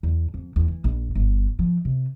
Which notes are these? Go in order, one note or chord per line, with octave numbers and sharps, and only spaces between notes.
E2
F2
E2
E3
A#1
G1
F3
C3